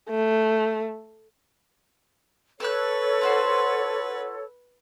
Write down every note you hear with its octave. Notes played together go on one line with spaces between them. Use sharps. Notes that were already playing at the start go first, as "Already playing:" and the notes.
A3
A4 B4 C#5 E6 F#6
F4 F#4 C5